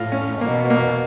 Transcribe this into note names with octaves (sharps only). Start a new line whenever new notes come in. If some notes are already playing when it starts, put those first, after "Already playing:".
Already playing: A2 F4
C#4
B2 A#3
A#3